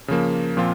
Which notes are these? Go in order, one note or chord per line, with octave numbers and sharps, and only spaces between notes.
C#3 F3 A#3
A#2 F3 C4 F4